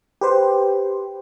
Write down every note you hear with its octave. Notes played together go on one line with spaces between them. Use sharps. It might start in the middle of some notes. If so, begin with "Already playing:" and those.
G4 B4 C5